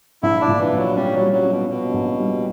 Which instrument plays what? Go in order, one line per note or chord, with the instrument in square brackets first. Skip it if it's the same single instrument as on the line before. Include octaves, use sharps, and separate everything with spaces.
[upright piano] A#1 [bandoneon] E4
[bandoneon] D4
[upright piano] A#2
[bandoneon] E3
[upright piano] A#1
[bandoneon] F#3
[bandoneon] G3 [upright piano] C#4
[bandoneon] F#3
[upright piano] G3
[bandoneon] F#3
[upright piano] C#4
[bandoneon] B2
[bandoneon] B2 [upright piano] C#4
[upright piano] A#1
G3